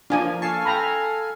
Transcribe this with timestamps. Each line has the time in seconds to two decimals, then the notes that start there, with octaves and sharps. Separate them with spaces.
0.10 F3 A#3 D4 F4 G#5
0.42 A4 F5 G#5 A5 C#6 C7
0.65 G5 A#5 B5